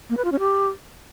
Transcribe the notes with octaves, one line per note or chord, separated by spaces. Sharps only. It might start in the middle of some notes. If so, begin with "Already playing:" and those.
A#3
B4
F4
C#4
G4